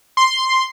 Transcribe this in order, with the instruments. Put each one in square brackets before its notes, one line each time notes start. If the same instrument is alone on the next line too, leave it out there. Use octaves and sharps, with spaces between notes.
[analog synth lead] C6